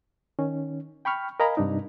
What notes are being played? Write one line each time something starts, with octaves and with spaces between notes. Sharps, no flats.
D#3 C#4
G5 B5 C#6 F6
A#4 D#5 F5 G#5 A#5 B5
G2 C3 D4 D#4